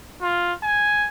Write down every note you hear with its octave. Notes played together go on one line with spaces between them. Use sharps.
F4
G#5